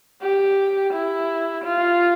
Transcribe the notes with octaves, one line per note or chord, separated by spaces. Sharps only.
G4
E4
F4